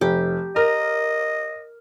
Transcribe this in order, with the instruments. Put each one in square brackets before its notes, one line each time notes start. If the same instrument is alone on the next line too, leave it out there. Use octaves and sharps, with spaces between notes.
[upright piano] F1 [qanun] G4
[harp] A#4 [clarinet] D#5 [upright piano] F6